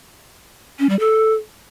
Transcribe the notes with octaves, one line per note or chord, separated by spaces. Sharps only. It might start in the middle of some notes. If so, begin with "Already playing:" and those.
C#4
G3
A4